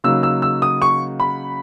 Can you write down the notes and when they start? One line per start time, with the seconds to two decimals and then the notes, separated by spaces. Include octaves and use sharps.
0.04 C#3 F#3 A#3 D#4 E6
0.23 E6
0.42 E6
0.62 D#6
0.82 C#6
1.20 B5